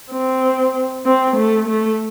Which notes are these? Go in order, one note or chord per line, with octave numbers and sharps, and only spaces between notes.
C4
C4
A3
A3